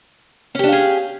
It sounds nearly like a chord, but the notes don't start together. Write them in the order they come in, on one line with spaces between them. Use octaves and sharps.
C#4 G4 D4 F5 G#4